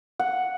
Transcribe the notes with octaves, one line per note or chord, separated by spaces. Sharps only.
F#5